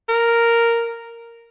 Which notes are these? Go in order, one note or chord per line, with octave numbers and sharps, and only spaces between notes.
A#4